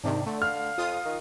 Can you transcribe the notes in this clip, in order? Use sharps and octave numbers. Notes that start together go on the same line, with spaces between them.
G#2 C3 D#3 D4 D#4
D3 A3 D5
F5 F6
F2 F4 D#6
D#3